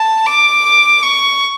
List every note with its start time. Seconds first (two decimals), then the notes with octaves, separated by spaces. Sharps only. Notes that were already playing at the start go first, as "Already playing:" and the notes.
Already playing: A5
0.26 D6
1.03 C#6